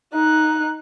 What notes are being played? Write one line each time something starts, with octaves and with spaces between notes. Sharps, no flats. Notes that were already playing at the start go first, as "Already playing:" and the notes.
D#4 F#6